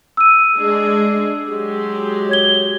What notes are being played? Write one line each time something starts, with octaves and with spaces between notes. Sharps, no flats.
E6 D#7
G#3 D4 G#4
F#3 G#3 G4
C#5 G#6 G7